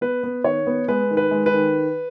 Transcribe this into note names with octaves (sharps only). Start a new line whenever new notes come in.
B3 B4
B3
D#3 C#5
B3
G#3 B4
D#3
B4
G#3
B4
D#3